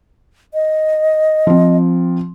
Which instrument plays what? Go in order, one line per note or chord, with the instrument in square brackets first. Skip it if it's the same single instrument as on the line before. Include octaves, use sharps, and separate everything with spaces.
[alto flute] D#5
[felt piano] F3 C4